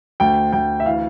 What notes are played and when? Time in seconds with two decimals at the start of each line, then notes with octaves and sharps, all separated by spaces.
0.20 D2 G5
0.53 D2 G5
0.80 E5
0.86 E3 F5